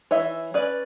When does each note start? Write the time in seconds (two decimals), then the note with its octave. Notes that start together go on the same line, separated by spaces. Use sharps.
0.11 E3 C#5 E5
0.54 C#4 B4 D5